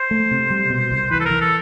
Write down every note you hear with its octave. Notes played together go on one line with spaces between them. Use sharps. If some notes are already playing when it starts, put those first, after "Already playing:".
Already playing: C5
A3
C3
G3
B2
C2
E3 B4
A4
E3 A#4
A4